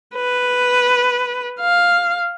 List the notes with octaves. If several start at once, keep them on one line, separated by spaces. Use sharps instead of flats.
B4
F5